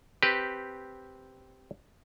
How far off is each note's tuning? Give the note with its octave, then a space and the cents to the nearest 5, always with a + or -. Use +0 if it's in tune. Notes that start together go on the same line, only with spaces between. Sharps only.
C4 +0 G4 +0 B4 +0